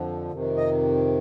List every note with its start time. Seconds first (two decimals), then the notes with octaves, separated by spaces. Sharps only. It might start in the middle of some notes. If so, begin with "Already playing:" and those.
Already playing: F2 D3 F3
0.32 F2 C3 D#3
0.56 D#5